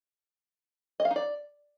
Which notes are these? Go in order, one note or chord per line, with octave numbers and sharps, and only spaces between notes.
D#5
F5
D#4
D5